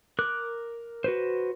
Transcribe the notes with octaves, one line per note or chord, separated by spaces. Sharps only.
A#4 D6 F#6
F#4 B4 C5